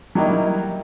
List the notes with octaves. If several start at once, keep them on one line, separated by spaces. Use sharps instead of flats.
F#3 G3 A#3 D#4 E4 G4